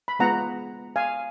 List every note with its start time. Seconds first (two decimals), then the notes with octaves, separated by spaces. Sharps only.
0.08 B5
0.19 G#3 B3 F4 F#5 A#5
0.96 F5 G#5